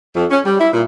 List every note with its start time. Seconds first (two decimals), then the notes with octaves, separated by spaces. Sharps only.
0.15 F2
0.31 C#4
0.45 G3
0.60 E4
0.73 A#2